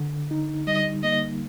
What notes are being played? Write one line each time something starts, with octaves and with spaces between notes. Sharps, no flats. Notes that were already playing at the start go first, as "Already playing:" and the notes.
Already playing: D3
D#4
G3 D#5
A#3 D#5